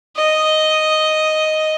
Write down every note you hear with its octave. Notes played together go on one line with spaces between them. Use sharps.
D#5